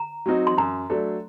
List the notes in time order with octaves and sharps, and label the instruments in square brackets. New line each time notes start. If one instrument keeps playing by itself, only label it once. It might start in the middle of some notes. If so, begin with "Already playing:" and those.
Already playing: [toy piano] A#5
[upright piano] F#3 C4 D#4 F#4
[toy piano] C6
[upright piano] F#2 [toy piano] A#5
[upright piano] F#3 A3 D4 A4